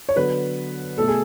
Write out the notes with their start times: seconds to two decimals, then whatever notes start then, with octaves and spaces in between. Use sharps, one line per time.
0.09 C#5
0.16 D3 F#3 B3 B4
0.98 B2 A3 A4
1.08 G#4